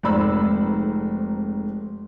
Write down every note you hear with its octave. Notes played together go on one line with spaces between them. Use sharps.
F1 F2 G#2 D5 B5 E6